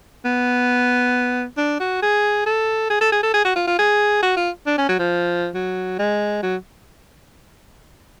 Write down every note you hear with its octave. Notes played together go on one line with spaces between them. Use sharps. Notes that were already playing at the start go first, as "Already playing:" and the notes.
B3
D4
F#4
G#4
A4
G#4
A4
G#4
A4
G#4
F#4
F4
F4
G#4
F#4
F4
D4
C#4
F#3
F3
F#3
G#3
F#3